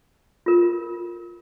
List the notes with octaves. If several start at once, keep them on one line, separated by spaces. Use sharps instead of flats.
F4 A#4